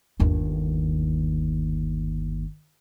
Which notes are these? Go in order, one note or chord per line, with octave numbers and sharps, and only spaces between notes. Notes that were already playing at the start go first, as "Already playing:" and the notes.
G1 D#2